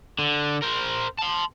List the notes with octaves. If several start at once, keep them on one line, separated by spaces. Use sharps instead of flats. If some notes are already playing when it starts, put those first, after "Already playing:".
D3
A#4 C5
A5 C6